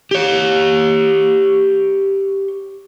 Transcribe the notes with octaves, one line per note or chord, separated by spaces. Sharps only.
G4 C#5